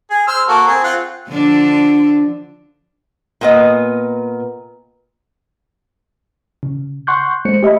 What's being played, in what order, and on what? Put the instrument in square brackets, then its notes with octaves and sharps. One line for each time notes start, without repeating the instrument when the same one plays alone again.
[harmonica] G#4
C5 E6 F6
A#3 F#4 A4
C4 G#4
C4 F4 F#5
[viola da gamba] D3 F3 D4
[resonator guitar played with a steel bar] A#2 B3 D#5
[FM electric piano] C#3
F#5 C6 C#6 F#6 G6
G#3 A3 C5 C#7
G4 D#5 E5 B5